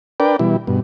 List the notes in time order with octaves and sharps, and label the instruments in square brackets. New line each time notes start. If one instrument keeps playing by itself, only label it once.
[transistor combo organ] D4 A#4 B4 D5 G5
B2 E3 G3 E4
G2 B2